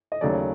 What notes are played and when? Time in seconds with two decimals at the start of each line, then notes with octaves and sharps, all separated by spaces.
0.12 D#5
0.21 D#2 C#3 F#3 A3 C#4 D5